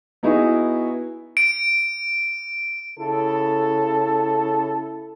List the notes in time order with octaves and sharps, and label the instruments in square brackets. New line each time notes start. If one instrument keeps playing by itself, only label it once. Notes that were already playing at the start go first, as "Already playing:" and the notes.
[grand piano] B3 D#4 E4 F#4 G#4
[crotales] D7
[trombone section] C#3 E4 A4